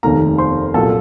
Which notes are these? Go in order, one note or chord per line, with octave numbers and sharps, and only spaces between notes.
F1 D#2 D#3 A3 A#4 A#5
C5 C6
C2 A#2 F#3 A4 A5